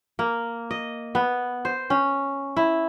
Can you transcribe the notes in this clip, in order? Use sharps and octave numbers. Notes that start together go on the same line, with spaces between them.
A#3
D#5
B3
C5
C#4
E4